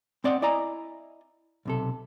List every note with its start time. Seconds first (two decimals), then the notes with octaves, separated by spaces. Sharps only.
0.24 C4 D5 D#5 F#5
0.42 E4 D5 D#5 G#5 A#5
1.65 B1 C3 A4